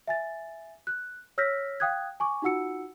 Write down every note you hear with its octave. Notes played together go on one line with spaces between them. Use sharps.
E5 G#5 A6
F#6
C#5 E6 F6 G6 A#6 B6
F5 G5 D#6 F#6 G#6
G#5 C#6 D6
D#4 F4 F#4 F#5 E6 C#7